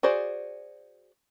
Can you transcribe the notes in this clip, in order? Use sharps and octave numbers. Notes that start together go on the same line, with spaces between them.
F#4 G#4 C5 D5